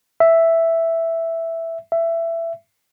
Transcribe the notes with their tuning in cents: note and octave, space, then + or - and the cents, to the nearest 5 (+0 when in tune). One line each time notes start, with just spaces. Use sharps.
E5 +0
E5 +15